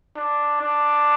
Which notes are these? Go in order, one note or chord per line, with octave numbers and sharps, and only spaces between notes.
D4
D4